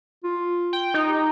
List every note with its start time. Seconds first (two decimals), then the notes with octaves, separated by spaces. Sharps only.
0.24 F4
0.73 G5
0.94 D#4
1.08 G4